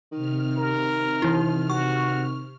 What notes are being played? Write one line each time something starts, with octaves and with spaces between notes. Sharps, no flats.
C3 D#3 F6
A#4
E3 E4
F#4 C#6